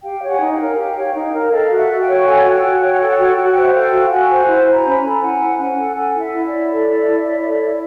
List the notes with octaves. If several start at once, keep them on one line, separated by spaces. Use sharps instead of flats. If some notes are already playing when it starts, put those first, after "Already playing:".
G4 F5 G5
C#5
F#5 G#5
D#4
F5 G5
A#4
G4
C#5
D#4
A#4
A4 D#5 F5
F#4
E5 F#5
F#4
F5 G5
C#5
A4 F#5 G#5
F#4
F5 G5
F#4
F#5
C#5 G5
F#5
A4 G5
F#5
F#4 G5
F#5
F#4 G5
F#5
C5 G5
E5 F#5
A4 F5 G5
F#4
F#4 F#5 G#5
C5
E4
C5
G#5 A#5
C#4 B5
G#5 A#5
A4
E4 F#5 G#5
C5
C#4 F#5 G#5
A4
A4 F#5 G#5
E4
E5 F#5
E4
D5 E5
C#5
A4
E4
E4
C#5
A4
E4